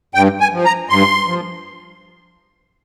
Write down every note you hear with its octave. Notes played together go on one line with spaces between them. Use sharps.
G2 G5
G#5
F3
A#5
G2 C6
F3